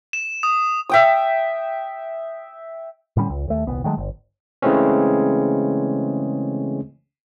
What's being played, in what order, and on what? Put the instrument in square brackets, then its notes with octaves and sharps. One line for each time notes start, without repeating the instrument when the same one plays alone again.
[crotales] E7
D#6
[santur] E5 G5 D#6
[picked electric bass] A2 D3 G3 C#4
C#2
D#2 A3
D#1 C2 B3
D#3 F#3 G#3 A3
G1
[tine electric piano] C#3 E3 G#3 A3 C4 C#4